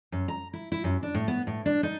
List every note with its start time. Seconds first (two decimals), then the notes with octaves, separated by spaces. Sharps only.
0.12 F#2
0.28 A#5
0.53 E4
0.72 E4
0.84 F#2
1.03 D4
1.14 A2
1.28 B3
1.47 A2
1.66 D4
1.83 D#4